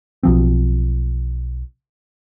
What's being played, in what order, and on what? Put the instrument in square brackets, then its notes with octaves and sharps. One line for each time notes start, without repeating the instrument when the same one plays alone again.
[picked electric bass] B1 F3 C4